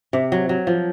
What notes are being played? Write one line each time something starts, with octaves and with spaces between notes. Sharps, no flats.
C3
F#3
F#3
F3